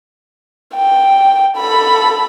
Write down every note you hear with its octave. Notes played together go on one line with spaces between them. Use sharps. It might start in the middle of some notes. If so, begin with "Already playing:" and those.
G5
A4 B5